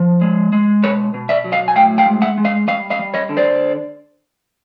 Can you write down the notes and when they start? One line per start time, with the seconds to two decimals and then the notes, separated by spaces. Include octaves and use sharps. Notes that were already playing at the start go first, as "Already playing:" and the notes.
Already playing: F3
0.21 G#3
0.53 G#3
0.83 B2 B4 C#5
1.14 B2
1.29 D5 E5
1.44 F#3
1.52 D#5 F5
1.68 G#5
1.76 A2 F5 G5
1.98 F5 G5
2.06 G#3
2.22 E5 F#5
2.38 G#3
2.45 D#5 F5
2.68 G3 D#5 F5
2.90 D#5 F5
2.99 G3
3.14 C#5 D#5
3.29 D3
3.37 C5 D5